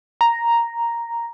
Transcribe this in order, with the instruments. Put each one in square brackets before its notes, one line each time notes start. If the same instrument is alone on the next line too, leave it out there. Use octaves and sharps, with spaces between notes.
[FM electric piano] A#5